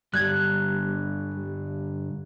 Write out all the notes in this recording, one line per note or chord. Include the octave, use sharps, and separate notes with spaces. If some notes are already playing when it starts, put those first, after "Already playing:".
G2 D3 G3 F#6 G#6
G3